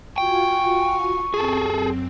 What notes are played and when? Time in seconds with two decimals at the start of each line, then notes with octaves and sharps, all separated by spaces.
0.18 F4 F#4 G5 G#5 C#6
1.34 F#2 C4 G#4 A4